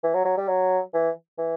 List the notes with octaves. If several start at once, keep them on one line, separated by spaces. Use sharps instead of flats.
E3
F#3
F#3
G3
F#3
E3
E3